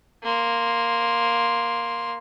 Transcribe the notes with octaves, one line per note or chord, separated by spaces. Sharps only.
A#3 C6